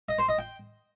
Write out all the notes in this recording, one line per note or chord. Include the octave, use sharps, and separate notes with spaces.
D#5
C5
D#5
G5